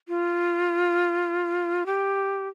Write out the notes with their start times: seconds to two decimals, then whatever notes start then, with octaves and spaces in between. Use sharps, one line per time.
0.08 F4
1.86 G4